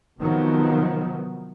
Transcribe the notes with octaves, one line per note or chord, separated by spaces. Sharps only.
C3 D#3 F3 F#3 B3